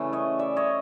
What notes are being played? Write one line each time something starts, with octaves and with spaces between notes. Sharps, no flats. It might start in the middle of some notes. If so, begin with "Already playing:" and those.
Already playing: C#3 E3 A3
C#5 D#5
D5 E5
C#5 D#5